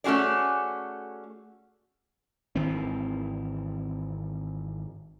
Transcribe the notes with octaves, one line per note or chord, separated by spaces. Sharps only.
A3 C#4 F#4 G#4 D5
G#1 D#3 E3 C4